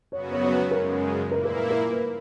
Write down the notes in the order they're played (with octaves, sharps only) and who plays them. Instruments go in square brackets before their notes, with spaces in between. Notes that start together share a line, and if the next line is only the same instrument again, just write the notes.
[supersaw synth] F#2 C#3 F#3 B3 F#4 [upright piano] C#5
[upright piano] C#5
C#5
B4
[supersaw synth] F#2 C#3 G#3 [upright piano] A#4
[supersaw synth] A#2 A#3 E4 [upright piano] A#4
[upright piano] A#4
B4
A#4
B4